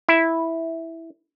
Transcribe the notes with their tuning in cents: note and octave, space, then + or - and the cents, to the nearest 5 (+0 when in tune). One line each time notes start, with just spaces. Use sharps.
E4 -5